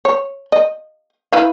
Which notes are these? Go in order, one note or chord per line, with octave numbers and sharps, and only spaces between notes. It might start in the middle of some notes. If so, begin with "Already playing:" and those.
C#5
D#5
E4 B4 F5